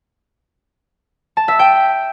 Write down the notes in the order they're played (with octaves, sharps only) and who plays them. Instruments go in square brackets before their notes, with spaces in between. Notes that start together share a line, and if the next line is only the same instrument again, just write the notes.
[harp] A5
E5
G5